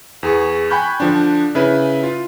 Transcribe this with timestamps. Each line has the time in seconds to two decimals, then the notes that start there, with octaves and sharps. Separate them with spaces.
0.23 E2 G#4 C#6
0.70 G5 G#5 B5 C#6 F#6 G6
1.00 D3 F3 D4
1.55 C#3 E4 B4
2.03 F4